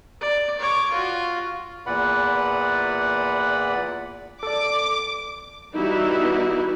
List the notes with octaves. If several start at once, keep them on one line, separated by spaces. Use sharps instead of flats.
D5
C#5 D6
F4 F#4
E2 A#2 B4 D5 F#5 B5
A4 D5 D6
E3 G3 B3 D#4 E4 F#4